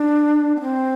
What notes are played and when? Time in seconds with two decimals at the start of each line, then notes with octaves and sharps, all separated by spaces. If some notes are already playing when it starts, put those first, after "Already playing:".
Already playing: D4
0.56 B3
0.61 C4